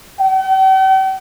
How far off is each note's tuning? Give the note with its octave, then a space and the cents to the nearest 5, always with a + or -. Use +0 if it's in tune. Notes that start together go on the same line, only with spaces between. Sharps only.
G5 -45